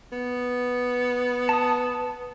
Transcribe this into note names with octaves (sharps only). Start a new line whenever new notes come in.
B3
A5 D#6